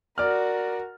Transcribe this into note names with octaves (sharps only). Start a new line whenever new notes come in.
F#4 A#4 D5 F6